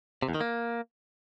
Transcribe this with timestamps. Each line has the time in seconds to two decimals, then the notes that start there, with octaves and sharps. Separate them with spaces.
0.22 C3
0.29 E2
0.35 D#3
0.41 A#3